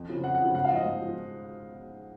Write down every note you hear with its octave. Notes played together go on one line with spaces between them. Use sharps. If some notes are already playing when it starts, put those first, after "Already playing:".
Already playing: F2
C#3 F3
F2 F#5
F#5
F3
C#3
G#2 F#5
F5
F3
D#5
G#2
F3